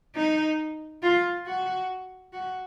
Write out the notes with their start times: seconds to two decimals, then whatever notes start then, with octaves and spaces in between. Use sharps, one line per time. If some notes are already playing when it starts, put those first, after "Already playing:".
0.16 D#4
1.03 F4
1.46 F#4
2.33 F#4